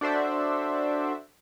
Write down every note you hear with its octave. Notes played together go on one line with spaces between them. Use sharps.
D4 F#4 A4 C5 D5 E5